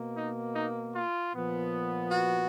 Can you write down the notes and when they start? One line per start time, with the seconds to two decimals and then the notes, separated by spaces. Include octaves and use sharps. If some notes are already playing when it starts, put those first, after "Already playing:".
Already playing: B2 A#3
0.17 D#4
0.55 D#4
0.95 F4
1.34 A#2 F3 B3
2.11 F#4